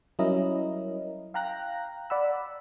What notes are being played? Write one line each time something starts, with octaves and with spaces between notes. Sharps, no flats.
F#3 G3 C#4 E4 A#4 D#5
F5 G5 A#5 F#6 A#6
D5 F#5 B5 E6